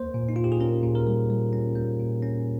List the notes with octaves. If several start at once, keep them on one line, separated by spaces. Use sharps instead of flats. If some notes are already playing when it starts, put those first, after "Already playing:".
Already playing: A#3 C5
A#2
D#4
A#2 F4
G4
G#4
C#4 A#4
A#2
A#4
G3
G3
C#4
A#3
A#2
C#4